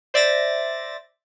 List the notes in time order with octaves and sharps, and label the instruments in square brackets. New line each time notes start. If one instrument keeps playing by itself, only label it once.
[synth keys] C5 D5 E5 A6 A#6